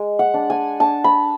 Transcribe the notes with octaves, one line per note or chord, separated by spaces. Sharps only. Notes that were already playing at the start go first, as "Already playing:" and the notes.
Already playing: G#3
F#5
D4
G#5
D4 A5
B5